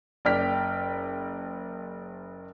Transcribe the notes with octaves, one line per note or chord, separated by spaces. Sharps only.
F#1 D5 G5 F6 B6